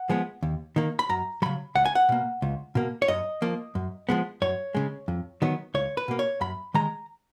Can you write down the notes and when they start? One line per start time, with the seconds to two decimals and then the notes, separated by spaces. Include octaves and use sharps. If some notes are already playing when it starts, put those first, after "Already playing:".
Already playing: F#5
0.09 F3 G#3 B3
0.43 D#2
0.76 D#3 A#3
0.99 B5
1.09 F#2 A#5
1.42 C#3 F#3 B5
1.75 C#2 F#5
1.86 G#5
1.95 F#5
2.09 B2 A#3
2.42 C#2
2.75 B2 A#3
3.02 C#5
3.08 F#2 D#5
3.42 F3 A#3
3.75 F#2
4.09 F3 G#3 B3
4.42 F#2 C#5
4.75 C#3 G#3
5.08 F2
5.42 D#3 F#3 B3
5.74 C#2 C#5
5.97 B4
6.08 B2 A#3
6.19 C#5
6.41 F#2 B5
6.74 D#3 G#3 A#5